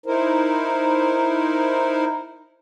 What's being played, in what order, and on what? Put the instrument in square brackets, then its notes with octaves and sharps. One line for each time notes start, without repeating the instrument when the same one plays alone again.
[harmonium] D#4 E4 A#4 C5